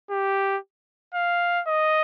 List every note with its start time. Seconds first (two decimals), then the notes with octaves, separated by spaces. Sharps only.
0.11 G4
1.15 F5
1.67 D#5